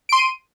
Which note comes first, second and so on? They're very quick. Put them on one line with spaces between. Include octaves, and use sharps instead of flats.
D7 C6 D#7